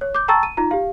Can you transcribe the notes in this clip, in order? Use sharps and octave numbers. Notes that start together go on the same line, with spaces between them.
C#5
D6 G6
G5 A5 A#5 C#6 E6 A6
D#7
D#4 F4 A#5
G4 F5